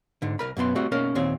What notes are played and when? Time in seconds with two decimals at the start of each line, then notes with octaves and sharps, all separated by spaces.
0.22 G#2 D3
0.39 C2 A#4 B5
0.57 F#2 B2 B3 C6
0.75 G3 A3 C4 F#4
0.92 B2 A#3 C#4 A#4
1.15 D#2 A#2 C4 C#5